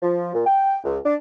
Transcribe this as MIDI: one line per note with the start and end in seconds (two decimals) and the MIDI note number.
0.03 0.33 53
0.34 0.46 46
0.46 0.79 79
0.84 0.97 37
1.05 1.15 62